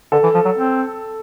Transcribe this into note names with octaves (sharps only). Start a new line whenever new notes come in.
D3 A4
E3
F3
F#3
C4